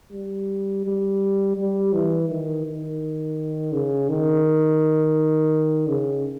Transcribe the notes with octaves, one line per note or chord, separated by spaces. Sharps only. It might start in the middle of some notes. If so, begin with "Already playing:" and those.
G3
G3
G3
E3
D#3
D#3
C#3
D#3
C#3